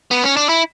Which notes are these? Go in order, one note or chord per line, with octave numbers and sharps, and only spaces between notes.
B3
C#4
D4
E4